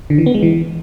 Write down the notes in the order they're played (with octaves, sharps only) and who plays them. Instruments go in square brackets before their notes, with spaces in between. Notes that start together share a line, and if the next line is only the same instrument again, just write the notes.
[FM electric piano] D3
E3
B3
G#3
E3